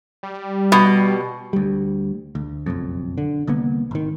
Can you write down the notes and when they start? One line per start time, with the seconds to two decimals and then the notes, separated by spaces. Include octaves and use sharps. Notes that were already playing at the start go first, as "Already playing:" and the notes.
0.23 G3
0.72 B2
1.53 D2 G3
2.35 D2
2.66 F#1 B1 F2
3.18 D3
3.47 C2 D3 A#3 B3
3.91 G#1 D#3